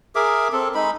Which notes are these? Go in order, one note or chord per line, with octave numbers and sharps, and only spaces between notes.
G#4 A#4 E5 D6
C4 A4
G#3 D#4 B5